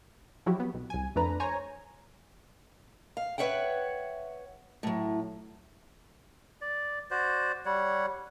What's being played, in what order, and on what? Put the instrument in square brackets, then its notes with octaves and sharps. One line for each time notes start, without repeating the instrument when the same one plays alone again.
[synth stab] F3 F#3 E4 F#4 G4
B3
B1
C2 G#5
F2 A3 D4 B4 A#5
C5 C#5 G#5 A#5
[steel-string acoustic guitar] F5
B4 C#5 E5 F#5 G5
A2 F#3
[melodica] D5
F#4 C5 D5
G3 C#5 F#5